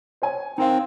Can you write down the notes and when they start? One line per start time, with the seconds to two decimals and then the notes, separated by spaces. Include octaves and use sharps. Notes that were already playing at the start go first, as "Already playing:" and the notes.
0.22 C5 C#5 G#5
0.58 C4 D#4 A#4 F5